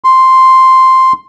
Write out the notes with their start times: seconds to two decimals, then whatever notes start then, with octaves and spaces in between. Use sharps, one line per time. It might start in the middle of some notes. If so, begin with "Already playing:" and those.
0.04 C6